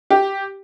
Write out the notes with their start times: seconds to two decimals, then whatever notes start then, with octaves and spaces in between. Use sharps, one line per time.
0.10 G4